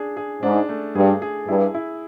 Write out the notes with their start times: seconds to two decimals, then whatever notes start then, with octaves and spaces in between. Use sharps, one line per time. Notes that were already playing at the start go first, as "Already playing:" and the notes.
Already playing: D4 G#4
0.17 G#4
0.43 G#2 D4
0.69 A3
0.95 G2 G#4
1.22 G#4
1.48 G2 E4
1.74 E4